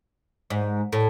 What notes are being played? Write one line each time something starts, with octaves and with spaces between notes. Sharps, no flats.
G#2
A2